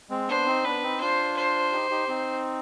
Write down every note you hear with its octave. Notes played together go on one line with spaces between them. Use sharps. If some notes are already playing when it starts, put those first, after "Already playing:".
G#3 C4
B3 D4 C5
C4 D#4
B3 D4 B4
C4 D#4
D4 F4 C5
C5
D#4 G4
D#4 G4
C4 D#4